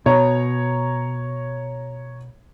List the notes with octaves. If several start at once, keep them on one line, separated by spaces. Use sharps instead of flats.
B2 C#5 A#5